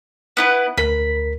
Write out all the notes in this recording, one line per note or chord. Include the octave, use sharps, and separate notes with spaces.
B3 E4 B4
D2 A#4 B5 B6